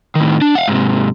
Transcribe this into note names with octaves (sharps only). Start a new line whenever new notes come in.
A2 D#3
D4
F5 F#5
G#2 C3